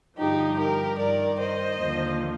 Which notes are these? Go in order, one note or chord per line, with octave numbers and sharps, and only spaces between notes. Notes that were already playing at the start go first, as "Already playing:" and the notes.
G2 D3 F3 D#4 G4
G4 A#4
G2 D#3 A#4 D5
C5 D#5
D#2 D3 F3